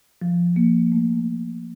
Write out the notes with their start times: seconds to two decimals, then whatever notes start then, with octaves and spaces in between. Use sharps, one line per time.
0.22 F3
0.56 A#3
0.92 A3